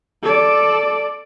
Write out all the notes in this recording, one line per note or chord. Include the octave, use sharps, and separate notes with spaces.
A4 D5